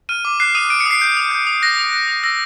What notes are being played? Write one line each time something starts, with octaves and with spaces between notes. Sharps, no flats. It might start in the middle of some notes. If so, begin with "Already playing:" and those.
F6 D#7
D6
F#6 C7
D#6 D#7
F#6 D7
C#7
D#6 C7
G6
D#6
G6
D#6
F#6 A#6
D#6
F#6
D#6
E6 A#6